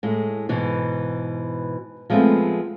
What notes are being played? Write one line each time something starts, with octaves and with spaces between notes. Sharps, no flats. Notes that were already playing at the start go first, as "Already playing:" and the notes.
A2 G#3
G#2 B2 E3
F3 G#3 A3 B3 C4